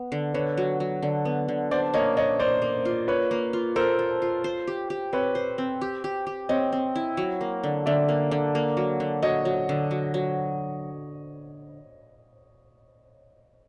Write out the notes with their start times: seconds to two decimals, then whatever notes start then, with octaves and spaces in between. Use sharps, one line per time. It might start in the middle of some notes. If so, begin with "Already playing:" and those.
Already playing: B3
0.12 D3
0.34 D3 B4 C#5
0.58 F#3
0.80 F#3
1.03 D3
1.25 B3
1.48 D3
1.71 D4 C5 D5
1.94 A#3 C#5 D#5
2.17 D4 C#5 D#5
2.39 A#3 C5 D5
2.62 A#3
2.85 F4
3.08 A#3 B4 C#5
3.31 A#3
3.53 F4
3.76 A4 A#4 C5
3.99 A4
4.22 F4
4.44 C5
4.67 G4
4.90 G4
5.13 C4 B4 C#5
5.35 C5
5.58 C4
5.81 G4
6.04 G4
6.27 G4
6.49 C4 C#5 D#5
6.72 C4
6.96 E4
7.17 F#3
7.41 A#3
7.64 D3
7.86 D3 D5 E5
8.09 A#3
8.31 D3
8.55 A#3
8.77 F#3
9.00 D3
9.22 F#3 C#5 D#5
9.45 F#3
9.69 D3
9.91 F#3
10.14 F#3